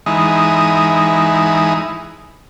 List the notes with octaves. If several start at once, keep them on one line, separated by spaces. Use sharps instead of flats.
E3 G#3 D#4